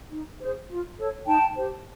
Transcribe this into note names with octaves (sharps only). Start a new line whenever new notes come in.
D#4
G#4 C5
F4
A4 C#5
D#4 G5 A5
G4 C5